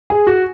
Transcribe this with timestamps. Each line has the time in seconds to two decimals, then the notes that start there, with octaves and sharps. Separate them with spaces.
0.10 G#4
0.27 F#4